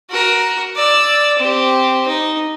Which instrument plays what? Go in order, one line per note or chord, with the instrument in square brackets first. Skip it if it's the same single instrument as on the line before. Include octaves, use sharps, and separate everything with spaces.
[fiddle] F#4 A#4
D5 E6
C4 G4
D#4